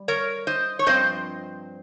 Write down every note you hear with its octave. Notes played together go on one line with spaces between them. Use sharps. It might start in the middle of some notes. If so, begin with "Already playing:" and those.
Already playing: G3
A#4 C#5
C5 D#5
C#5
G2 F3 C4 C5 D#5